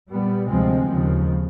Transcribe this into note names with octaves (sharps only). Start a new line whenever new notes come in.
A#2 G3 B3
D2 C3 F3 G#3 C4
D#2 C#3 F3